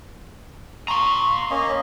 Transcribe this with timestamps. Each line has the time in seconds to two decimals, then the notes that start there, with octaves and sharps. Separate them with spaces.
0.88 A#5 C6 C#6
1.51 A#3 C#4 D#5